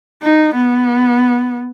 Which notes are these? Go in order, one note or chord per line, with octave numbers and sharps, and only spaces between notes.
D#4
B3